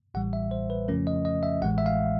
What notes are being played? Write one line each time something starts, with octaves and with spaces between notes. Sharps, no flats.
A1 A2 E3 G3 F#5
E5
C5
B4
F2 C#3 F3 A3 C#4 A#4
D#5
D#5
E5
A1 A2 E3 G#3 F#5
E5
F5